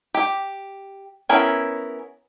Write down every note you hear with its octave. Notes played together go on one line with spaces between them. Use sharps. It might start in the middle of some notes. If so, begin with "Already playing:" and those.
G4
B3 C#4 E4 G#4 A#4